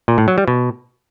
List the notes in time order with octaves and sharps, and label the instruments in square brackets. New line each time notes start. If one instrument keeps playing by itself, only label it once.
[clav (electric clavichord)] A#2
A2
F#3
G3
B2